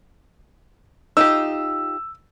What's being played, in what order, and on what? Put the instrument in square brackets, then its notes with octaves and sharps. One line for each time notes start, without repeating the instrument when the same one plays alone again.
[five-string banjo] D#4 F4 G4 [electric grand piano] E6